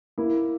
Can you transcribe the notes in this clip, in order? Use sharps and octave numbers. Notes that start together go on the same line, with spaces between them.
A#3 E4